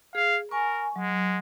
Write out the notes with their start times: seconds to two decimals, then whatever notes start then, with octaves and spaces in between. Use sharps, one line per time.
0.15 G#4 F5
0.51 A#4 G#5 C#6
0.96 F#3 G#3